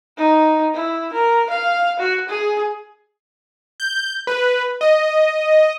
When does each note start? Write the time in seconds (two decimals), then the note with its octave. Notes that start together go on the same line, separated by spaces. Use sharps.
0.17 D#4
0.74 E4
1.13 A#4
1.50 F5
1.99 F#4
2.29 G#4
3.80 G6
4.27 B4
4.81 D#5